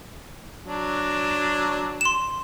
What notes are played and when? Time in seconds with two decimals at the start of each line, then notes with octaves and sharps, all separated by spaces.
0.66 F#3 D4
2.01 C6 E7